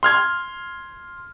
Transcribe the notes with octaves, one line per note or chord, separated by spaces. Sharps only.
C6 F6 G#6